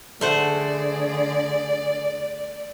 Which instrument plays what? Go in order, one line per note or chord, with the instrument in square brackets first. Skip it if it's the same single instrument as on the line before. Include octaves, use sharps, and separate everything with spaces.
[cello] D3 G#4 [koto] A3 C5 F#5 [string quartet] D5